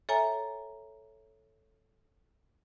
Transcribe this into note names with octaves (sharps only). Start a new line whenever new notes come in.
A4 C#5 E5 G#5 A#5